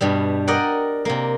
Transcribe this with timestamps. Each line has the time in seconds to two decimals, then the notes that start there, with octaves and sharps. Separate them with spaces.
0.01 G2 B2 G3
0.48 A#4 D5 D#5 F#5 G5
1.05 C3 A#3